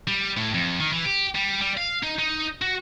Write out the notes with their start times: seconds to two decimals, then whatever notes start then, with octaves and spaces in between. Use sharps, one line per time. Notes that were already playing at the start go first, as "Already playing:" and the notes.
0.08 G3
0.37 A2
0.54 F2
0.80 D#3
0.93 E3
1.05 G4
1.35 G3
1.61 G3
1.77 F5
2.03 D#4
2.19 D#4
2.62 F#4